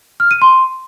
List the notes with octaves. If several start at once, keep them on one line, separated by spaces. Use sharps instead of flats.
F6
D#7
C6